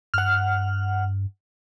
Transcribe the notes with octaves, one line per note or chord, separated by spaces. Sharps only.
G2 F#5 F6